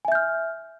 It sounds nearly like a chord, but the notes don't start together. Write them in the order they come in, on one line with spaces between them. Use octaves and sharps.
G#5 E5 G6 F6